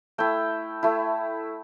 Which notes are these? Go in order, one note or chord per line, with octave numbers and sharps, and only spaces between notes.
A3 E4 G5
A3 E4